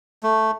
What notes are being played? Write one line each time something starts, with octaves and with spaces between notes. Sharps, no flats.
A3